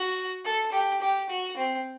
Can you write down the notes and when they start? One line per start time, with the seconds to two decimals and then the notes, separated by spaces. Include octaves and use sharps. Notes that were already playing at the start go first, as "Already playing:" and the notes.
Already playing: F#4
0.45 A4
0.72 G4
1.02 G4
1.30 F#4
1.57 C4